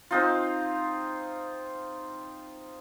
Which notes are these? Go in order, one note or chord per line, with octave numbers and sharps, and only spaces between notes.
C4 D#4 F4